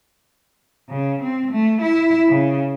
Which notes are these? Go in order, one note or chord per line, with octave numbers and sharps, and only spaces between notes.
C#3
C4
A3
E4
C#3